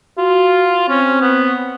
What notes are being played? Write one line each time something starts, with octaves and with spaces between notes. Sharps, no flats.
F4 F#4
C4 C#4
B3